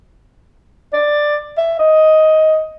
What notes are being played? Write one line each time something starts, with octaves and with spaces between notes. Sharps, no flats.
D5
E5
D#5